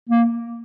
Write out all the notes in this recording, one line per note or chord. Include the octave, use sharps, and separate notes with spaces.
A#3